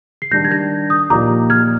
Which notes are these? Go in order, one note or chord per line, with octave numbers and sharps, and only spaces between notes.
C7
D#3 G3 D4 G4 G6 A#6
G#6
G6 A#6
D#6 G6
A#2 F3 A#3 D#4 G4 A#5 D6
F6 G#6